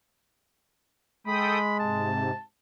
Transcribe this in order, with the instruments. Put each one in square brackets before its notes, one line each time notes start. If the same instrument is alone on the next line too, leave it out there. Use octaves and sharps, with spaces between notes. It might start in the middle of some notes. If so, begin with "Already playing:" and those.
[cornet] G#3 [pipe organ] A4 G5 D#6 [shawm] B5
[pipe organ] G#2 C3 [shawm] A5